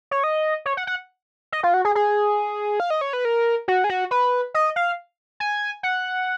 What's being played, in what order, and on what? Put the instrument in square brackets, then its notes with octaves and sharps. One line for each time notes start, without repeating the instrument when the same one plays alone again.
[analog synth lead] C#5
D#5
C#5
F#5
F#5
D#5
F4
F#4
G#4
G#4
F5
D#5
C#5
B4
A#4
F#4
G#4
F#4
B4
D#5
F5
G#5
F#5